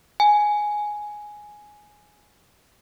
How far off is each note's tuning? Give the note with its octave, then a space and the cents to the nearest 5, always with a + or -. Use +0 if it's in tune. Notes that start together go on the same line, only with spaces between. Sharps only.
G#5 +5